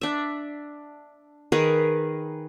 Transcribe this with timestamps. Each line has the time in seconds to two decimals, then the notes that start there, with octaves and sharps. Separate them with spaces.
0.01 D4 E5
1.52 D#3 G#4 A#4 B4